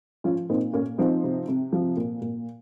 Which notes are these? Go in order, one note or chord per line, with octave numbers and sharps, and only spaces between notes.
F3 C#4 F4
A#2 C4 D#4
A#2 A#3 C#4
F3 C4 D#4
C3
C3
F3
A#2
A#2